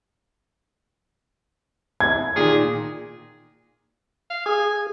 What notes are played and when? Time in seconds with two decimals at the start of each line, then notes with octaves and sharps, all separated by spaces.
2.00 G#6
2.36 A#2 D#3 G#4
4.30 F5
4.46 G#4 G#5